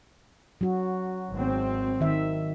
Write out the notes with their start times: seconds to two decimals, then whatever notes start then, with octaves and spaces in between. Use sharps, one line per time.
0.61 F#3 F#4
1.32 G#1 C4
2.01 D#3 E5